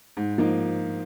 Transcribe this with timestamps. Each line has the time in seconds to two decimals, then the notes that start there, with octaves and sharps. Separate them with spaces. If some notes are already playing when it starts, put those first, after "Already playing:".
0.17 G#2
0.38 F3 A#3 D#4